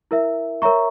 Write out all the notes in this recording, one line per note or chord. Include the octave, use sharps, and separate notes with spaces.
E4 A#4 E5
A#4 C#5 E5 A#5 C#6